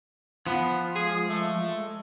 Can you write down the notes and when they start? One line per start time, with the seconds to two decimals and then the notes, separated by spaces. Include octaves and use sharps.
0.47 F3 B3
0.95 G#3 G#4
1.29 A3